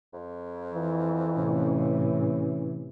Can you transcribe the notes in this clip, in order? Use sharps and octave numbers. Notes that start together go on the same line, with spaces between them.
F2
E3
A2 C3 C#4